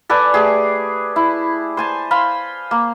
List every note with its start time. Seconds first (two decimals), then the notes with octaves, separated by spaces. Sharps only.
0.09 A4 B4 D5 G#5
0.34 A3 G4 G#4
1.16 E4
1.77 C5 G#5 A5
2.11 C5 F5 B5 C6
2.71 A#3